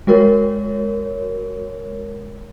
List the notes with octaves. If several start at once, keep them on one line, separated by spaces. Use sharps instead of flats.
G#3 F#4 A#4 C#5